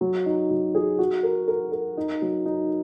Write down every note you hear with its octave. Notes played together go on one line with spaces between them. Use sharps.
F#3
D#4
F#3
G#4
F#4
A#4
A#4
A#4
D#4
F#3
D#4